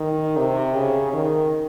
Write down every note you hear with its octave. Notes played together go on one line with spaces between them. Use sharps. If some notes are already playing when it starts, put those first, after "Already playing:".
Already playing: D#3
C3
C#3
D#3